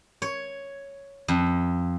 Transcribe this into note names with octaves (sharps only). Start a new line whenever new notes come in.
C#5
F2